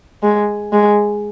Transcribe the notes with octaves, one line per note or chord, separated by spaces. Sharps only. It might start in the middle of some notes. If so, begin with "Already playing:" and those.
G#3
G#3